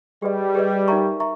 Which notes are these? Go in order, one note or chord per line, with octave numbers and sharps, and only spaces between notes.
G3 G#4 B4 D#5
G#4 B4 D#5
D#4 A#4 E5 A#5 C#6
E5 A#5 C#6